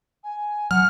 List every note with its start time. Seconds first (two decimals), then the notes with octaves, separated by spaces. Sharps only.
0.23 G#5
0.71 F#3 F#5 F6